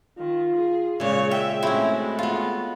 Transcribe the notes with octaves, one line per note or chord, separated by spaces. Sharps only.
D#3 F4
G#4
A#2 C#3 G#3 C#5
G#3 E5 G5
A3 C4 C#4 E4 F#4
B3 F4